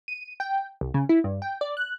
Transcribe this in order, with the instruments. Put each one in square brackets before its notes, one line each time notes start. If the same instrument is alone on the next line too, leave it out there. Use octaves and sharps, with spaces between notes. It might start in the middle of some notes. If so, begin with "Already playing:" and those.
[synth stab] D#7
G5
C2
C#3
E4
G2
G5
D5
F#6